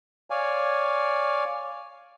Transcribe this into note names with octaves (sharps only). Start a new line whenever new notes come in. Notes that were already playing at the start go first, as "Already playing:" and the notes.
C#5 D5 F5 G#5